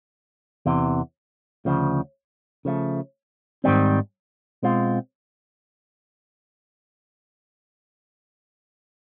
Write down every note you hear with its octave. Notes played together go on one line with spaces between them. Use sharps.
E2 C3 E3
D2 C#3 F3
C#3 F3 A3
G#2 D#3 G3 C4
B2 G#3 C4 F4